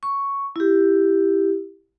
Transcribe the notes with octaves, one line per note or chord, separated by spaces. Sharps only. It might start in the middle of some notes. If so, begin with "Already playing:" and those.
C#6
E4 G4